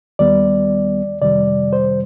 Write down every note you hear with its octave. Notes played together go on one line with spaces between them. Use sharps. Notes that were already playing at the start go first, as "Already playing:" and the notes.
D#2 D#3 G3 B3 D5
F2 C3 D#3 G3 D5
C5